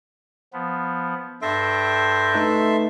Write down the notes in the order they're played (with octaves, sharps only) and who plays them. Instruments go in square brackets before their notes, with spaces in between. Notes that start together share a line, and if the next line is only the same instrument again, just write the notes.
[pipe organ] F3 B3
[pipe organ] G2 G5 A#6 [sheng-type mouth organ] A4 E5 C6
[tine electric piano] A3 D#4 B4